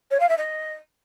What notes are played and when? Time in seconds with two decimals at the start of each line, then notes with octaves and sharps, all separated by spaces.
0.11 C#5
0.20 F5
0.29 E5
0.38 D#5